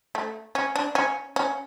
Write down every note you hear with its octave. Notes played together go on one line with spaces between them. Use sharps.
A3
C#4
D4
C#4
C#4